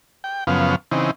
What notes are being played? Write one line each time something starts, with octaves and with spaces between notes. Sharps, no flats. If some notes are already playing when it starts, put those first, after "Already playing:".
G5
F#2 C#3 F3 B3 F5
C#3 E3 C4 D#4